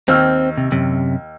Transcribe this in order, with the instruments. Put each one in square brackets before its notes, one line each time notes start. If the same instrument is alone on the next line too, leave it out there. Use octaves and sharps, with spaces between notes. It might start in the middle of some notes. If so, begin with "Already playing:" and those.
[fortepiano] D#2 E6 F6 [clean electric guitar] C4
[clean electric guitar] C3
F#2 C3